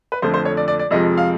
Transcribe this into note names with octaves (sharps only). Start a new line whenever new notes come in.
B4
F2 D3 F3 A3 C5
C5
C#5
D5
D5
D5
F2 C3 F3 G#3 D#5
F5